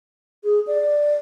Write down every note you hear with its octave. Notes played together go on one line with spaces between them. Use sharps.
G#4
D5